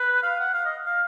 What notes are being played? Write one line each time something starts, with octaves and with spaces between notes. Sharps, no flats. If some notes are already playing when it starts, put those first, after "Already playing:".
Already playing: B4
F5
F#5
F5
D#5
F5